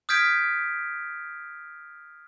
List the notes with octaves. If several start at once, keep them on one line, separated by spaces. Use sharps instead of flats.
D#6 F6 G6 G#6 B6 D7